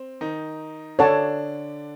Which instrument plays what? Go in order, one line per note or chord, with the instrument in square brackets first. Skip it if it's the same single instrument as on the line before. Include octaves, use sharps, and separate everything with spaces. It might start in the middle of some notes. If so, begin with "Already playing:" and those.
Already playing: [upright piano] C4
D#3 D#4
[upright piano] D3 D4 [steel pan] A4 C#5 F#5 A5